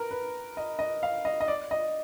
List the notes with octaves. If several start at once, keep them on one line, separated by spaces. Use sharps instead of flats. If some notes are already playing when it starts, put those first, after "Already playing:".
Already playing: A#4 B4
B4
D#5
D#5
F5
D#5
D#5
D5
D#5